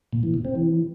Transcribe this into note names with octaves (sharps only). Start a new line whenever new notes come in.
A#2
E3
B2
C4
E3